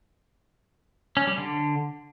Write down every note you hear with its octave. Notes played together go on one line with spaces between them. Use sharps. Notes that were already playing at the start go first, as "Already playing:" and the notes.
C#4
G3
D3